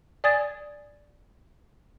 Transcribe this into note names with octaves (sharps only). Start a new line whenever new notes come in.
D5 G#5 D#6 G#6 A6